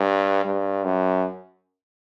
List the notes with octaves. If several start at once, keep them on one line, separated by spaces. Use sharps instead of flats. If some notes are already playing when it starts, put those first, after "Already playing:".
Already playing: G2
G2
F#2